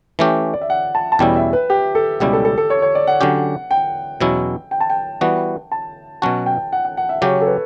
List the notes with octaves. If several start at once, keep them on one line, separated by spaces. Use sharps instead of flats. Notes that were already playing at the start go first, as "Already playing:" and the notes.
E3 A3 C#4 G4
D5
E5
F#5
A5
A5
E2 B2 G3 C#4 E4 G5
E5
B4
G4
A4
C#2 B2 G3 C#4 E4 G4
A4
A4
A4
C#5
C#5
D5
F#5
D3 F#3 C#4 G4
G5
E2 B2 F#3 C#4 E4
G5
A5
G5
E3 G3 B3 F#4
A5
B2 F#3 C#4 F#4 A5
G5
F#5
F#5
F#5
E5
C#3 F#3 C#4 G4 C#5
A4
B4